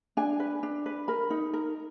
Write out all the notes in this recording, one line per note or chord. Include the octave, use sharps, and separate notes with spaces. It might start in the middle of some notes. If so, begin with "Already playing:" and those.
D4 G#5
B4
D4
B4
A#4 B5
D#4
A#4